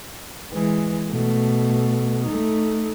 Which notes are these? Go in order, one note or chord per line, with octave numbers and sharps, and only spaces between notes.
E3 G#3
B2 A3
A3 D#4